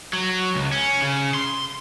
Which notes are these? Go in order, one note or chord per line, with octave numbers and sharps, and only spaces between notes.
F#3
C#2
C#4
C#3
C6